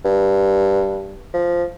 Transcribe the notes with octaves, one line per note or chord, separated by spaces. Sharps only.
G2
F3